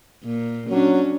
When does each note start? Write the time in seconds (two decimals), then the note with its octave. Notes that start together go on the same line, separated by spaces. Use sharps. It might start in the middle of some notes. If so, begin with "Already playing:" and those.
0.24 A#2
0.70 F#3 C#4 D4